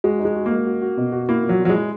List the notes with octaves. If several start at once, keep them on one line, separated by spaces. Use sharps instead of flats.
G#3 F#4
D#4
G#3
F#4
G#3 A#3
F#4
F#4
B2
F#4
A#3 E4
A#2
F#3
A#2
F#3
G#3
E4